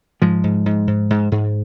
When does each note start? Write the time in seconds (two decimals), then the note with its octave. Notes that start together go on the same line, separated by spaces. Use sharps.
0.22 G#2 F3 G#3
0.44 G#2
0.66 G#2
0.87 G#2
1.10 G#2
1.32 G#2